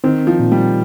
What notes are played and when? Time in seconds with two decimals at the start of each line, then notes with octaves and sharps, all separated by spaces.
0.04 D#3 C4
0.27 F3
0.40 A#2
0.52 G3